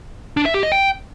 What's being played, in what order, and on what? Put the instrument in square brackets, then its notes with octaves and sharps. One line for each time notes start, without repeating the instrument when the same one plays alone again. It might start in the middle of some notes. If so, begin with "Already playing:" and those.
[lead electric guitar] D4
E5
G4
D#5
G5